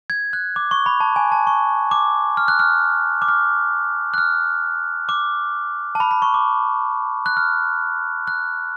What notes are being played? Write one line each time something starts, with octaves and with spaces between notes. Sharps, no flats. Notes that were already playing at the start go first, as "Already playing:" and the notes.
G#6
F#6
D6
C#6
B5
A5
G#5
A5
C#6
D6
F6
F#6
F6
D6
F6
F#6
F6
D6
A5
B5
B5
C#6
D6
F#6
F6
F#6